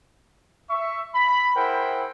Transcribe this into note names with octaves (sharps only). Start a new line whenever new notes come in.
E5 C#6
B5
E4 G#4 A#4 C5 F#5 G5